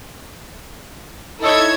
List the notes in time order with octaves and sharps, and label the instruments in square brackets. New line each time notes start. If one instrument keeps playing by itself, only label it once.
[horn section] D#4 A4 [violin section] E4 C#5 G#6